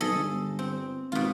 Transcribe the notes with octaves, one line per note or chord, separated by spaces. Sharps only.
B1 G#4 A4 D#5
G1
C4
G#1 B2 F4